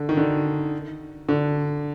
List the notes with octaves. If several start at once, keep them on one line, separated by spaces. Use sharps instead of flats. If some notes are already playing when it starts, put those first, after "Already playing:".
Already playing: D3
D#3
D3
D3